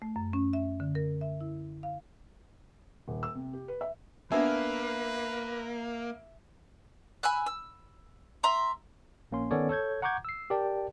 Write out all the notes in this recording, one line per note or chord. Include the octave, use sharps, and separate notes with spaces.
A3
F#2
C#4
E5
D3
A#4
E5
E4
F5
D#1
E6
C3
G4
B4
E5
A#3 B3 D4 B4 E5 G#5
G#5 B5 E6 F#6
E6
E5 A#5 C6
A#1 A#3 C#4 C6
D#3 B3 C#4 A4 C#5 D5
A4 C#5 G6 G#6
F#5 A#5 C#6 D6 G6 G#6
E6 C7
G4 A#4 D5 G5 A5